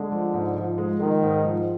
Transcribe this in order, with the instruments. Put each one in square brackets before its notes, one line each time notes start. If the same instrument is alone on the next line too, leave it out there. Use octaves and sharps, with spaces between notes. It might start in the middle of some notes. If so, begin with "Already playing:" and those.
Already playing: [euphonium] D3 [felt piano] G#3
[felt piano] F3
G#2
F3
G#3
[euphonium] D#3 [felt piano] G#3
[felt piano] G#2
F3